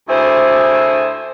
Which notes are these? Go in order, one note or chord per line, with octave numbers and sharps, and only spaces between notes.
D2 E4 G#4 C5